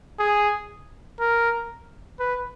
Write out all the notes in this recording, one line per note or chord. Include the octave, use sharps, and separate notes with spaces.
G#4
A#4
B4